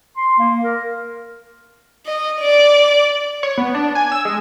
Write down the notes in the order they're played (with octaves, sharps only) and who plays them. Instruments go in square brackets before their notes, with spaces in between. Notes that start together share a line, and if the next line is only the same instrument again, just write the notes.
[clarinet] C6
A#3
A#4
[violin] D#5
D5
[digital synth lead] C#5
B3
D4
G#5
E6
G#3